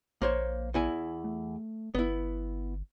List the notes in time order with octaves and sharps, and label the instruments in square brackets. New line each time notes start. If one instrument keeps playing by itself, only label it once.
[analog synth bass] A#1 [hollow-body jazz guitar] A#3 C5 C#5
[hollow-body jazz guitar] E2 E4 G#5
[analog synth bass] A3
[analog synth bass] G1 [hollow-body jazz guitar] B3 E4